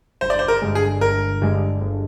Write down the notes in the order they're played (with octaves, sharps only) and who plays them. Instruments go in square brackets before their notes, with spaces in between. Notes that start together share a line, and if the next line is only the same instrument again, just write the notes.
[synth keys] G1 [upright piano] C5
[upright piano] D5
C5
A#4
[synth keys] G2 D3 G#3
[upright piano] G#4
[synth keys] G1 [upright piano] A#4
[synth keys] G2 D3 G#3
G1